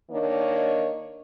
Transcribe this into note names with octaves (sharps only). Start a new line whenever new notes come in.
D#3 A#3 D4 C#5